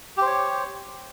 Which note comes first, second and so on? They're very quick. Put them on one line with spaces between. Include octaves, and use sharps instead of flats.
G4 C5 C#5